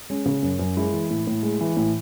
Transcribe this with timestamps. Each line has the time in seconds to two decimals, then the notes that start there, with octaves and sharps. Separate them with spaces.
0.10 G#3 C#4
0.26 C#3
0.43 F#2
0.59 F#2
0.77 G#3 E4
0.93 E3
1.10 A2
1.27 A2
1.43 G#3
1.61 E3
1.77 A2